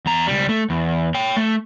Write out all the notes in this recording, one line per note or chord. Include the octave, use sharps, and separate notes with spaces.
E2 A#5
C#2 G3
A3
E2
C#5 G5
A3